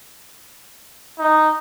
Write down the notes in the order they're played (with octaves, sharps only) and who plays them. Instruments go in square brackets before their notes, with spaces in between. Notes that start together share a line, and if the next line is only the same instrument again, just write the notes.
[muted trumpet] D#4